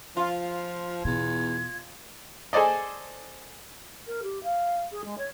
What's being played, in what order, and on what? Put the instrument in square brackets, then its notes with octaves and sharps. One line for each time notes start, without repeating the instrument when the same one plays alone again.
[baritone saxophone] F3 [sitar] F4
[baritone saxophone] E2 [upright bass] B2 [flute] G#6
[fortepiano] G#4 A4 C5 D5 D#5
[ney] A#4
G4
F5
G#4
G#3
C#5